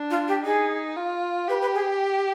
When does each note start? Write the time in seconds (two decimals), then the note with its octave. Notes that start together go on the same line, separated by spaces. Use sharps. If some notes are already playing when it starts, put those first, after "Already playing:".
Already playing: D4
0.10 F4
0.28 G4
0.45 D#4 G#4
0.96 F4
1.48 G4 B4
1.61 B4
1.74 G#4